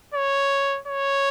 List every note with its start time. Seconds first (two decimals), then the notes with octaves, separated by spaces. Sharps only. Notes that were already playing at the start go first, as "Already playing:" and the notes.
0.14 C#5
0.87 C#5